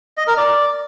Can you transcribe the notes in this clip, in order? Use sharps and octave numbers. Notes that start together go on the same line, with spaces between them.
D#5
A#4
D5